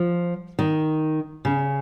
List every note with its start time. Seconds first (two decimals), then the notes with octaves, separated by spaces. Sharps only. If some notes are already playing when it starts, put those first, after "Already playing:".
Already playing: F3
0.59 D#3
1.45 C#3